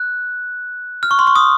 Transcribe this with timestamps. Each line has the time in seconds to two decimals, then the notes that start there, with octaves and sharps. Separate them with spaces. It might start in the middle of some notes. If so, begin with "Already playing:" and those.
Already playing: F#6
1.03 F6
1.11 C#6
1.19 C6
1.27 C#6
1.36 D#6